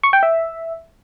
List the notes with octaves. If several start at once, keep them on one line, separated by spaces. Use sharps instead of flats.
C#6
G5
E5